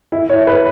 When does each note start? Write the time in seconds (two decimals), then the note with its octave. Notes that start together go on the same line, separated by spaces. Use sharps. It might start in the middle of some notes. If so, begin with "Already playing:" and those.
0.12 E4
0.29 C#5
0.47 B4